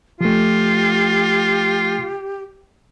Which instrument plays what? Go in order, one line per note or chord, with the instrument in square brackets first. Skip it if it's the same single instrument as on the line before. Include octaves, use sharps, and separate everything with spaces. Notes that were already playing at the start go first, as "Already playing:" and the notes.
[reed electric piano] F3 A3 [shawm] F4 [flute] G4